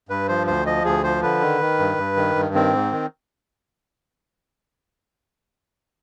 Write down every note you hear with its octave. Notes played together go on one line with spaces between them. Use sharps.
G2 B4
F3 C5
D2 C5
F3 D#5
D2 G#4
F3 C5
D3 B4
D#3
D#3
G2
G2
D#3
G2
D#3 C4
G#2
D#3